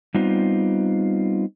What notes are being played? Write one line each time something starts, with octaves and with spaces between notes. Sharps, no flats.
G3 B3 C4 D#4 F4